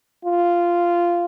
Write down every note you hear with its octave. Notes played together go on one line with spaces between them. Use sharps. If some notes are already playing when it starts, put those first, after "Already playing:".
F4